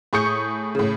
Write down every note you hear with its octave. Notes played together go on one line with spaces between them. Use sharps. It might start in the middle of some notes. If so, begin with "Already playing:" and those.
A2 G#4 C#6 D#6 G6 C#7
A2 C#3